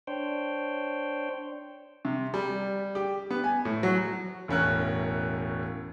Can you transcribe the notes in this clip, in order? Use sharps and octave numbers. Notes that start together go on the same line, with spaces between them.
D4 C5 C#5 G5
C3
G3
G4
B3
G#5
A2
F#3
E1 A2 C#4 A#4 F#6